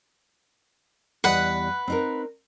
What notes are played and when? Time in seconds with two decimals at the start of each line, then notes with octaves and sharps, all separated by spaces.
1.24 E2 G3 B4 D#5 F#5
1.87 C4 D#4 A#4